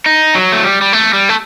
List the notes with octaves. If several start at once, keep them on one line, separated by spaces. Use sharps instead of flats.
D#4
F#3
A3
G3
G3
A3
G3
A3